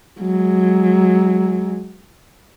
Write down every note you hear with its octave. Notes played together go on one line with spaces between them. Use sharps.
F#3 G#3